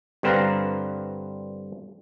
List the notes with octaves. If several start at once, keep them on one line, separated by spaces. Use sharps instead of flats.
G2 D3 C4 B4 F5 A#5